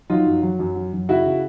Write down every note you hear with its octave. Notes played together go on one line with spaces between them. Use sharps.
F#3 D#4 F4
F#2
F#3
F#2
F#3
F#2
C#3 E4 F#4
C#3